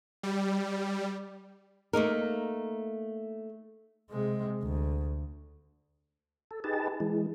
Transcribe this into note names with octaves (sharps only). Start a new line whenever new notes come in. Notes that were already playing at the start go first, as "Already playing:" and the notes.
G3
A3 A#3 D#4 A#4
C3 G#3
D2
A4
D#4 G4 G#4 B4 A5
E3 G#3